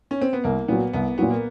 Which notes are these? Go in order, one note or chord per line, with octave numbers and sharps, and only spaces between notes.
C#4
C4
B3
C2 A#3
A#2 F#3 B3
C2 B3
A#2 F#3 B3
A#3